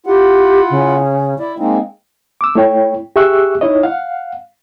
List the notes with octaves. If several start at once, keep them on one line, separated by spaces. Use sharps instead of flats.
E4 F4 G4 F#5
C#3
E4 D5
G#3 A#3 C4 D#4
D6 E6
A3 E4 C#5 G5
G4 G#4 E5 C#6 E6 F#6
D#4 E4 C#5 D#5
F5 F#5